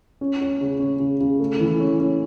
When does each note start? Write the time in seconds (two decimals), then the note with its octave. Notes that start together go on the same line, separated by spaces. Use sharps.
0.21 C#4
0.41 C#4
0.61 C#3
0.80 C#4
1.00 C#3
1.21 C#3
1.40 A3
1.60 E3
1.80 C#4
2.00 C#4